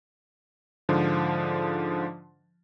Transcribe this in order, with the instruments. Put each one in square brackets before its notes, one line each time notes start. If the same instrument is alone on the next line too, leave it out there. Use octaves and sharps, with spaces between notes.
[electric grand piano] G#2 D3 F3